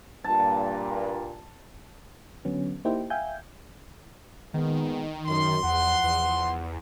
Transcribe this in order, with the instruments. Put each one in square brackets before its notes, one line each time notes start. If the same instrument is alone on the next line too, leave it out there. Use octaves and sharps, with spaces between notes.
[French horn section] G2 A#2 [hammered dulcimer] A5
[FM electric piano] D3 F#3 B3 C#4
A#3 D#4 E4 G4 C5 G5
E5 F5 G5 G#5 G6
[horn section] A#2 G#3 B3 [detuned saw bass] D#3
[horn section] F#2 [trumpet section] C6
[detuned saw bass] E2 [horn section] F3 F#5
[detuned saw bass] E2